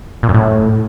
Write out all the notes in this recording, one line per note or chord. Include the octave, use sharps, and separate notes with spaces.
A#2
F#2
A2